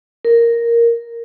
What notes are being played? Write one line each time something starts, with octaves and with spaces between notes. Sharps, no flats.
A#4